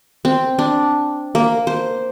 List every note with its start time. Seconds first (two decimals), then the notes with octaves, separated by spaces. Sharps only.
0.25 C4
0.59 D4
1.35 A#3
1.67 C5